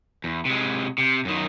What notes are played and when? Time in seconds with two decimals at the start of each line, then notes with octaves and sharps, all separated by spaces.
0.24 E2
0.45 C3 G#3
0.98 C3
1.25 F#2 D#3